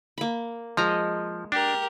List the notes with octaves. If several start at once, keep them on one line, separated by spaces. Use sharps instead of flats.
A#3 B5
F3 G#3 A#5
D4 G4 A#4